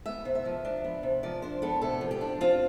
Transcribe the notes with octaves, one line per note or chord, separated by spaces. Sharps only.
B3 E5
C3
E5
F3
D4
B3
C3
F3 D5
D4 C5
B3 A4
C3 A4
F3
G4
D4
C4 F4